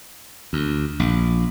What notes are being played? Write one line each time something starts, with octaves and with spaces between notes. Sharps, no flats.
D2
A#1